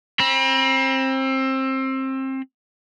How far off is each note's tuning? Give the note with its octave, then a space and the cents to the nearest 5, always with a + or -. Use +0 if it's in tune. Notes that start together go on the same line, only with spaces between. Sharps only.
C4 +25 B5 -35